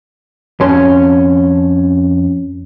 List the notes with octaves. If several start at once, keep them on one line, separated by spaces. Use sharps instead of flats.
F2 C#4 C6